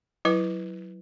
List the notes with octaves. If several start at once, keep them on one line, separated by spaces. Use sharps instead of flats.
F#3 E4 B4 D6